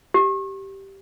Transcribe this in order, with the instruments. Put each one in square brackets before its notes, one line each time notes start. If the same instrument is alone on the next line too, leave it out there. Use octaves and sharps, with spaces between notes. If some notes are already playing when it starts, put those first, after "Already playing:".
[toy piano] G4